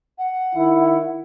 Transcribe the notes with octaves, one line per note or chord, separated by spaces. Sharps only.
F#5
D#3 E4